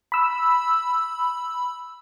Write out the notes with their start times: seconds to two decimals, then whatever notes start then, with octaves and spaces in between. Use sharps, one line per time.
0.12 B5 E6